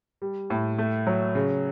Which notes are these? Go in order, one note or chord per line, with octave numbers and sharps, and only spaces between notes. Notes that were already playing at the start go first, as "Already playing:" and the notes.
G3
A2
A3
F#3
C#3